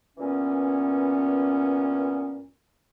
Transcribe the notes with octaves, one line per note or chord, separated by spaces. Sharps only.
G2 A#2 E3 B3 C#4